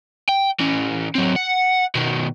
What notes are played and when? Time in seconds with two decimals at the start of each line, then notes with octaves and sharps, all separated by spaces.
0.29 G5
0.60 E3 C#4
1.15 F#3 C4
1.36 F#5
1.95 B2 D#3